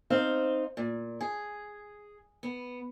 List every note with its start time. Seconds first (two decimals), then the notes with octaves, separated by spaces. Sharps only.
0.10 C4 D#4 C5 F5
0.77 A#2
1.21 G#4
2.43 B3